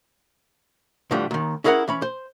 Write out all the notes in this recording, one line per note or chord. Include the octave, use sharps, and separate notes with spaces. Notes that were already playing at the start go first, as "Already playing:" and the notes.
A2 D3 E3 F3 G3
D#2 D#3
C#4 E4 G#4 A#4 F5 F#5
E3 C#4 B5
C5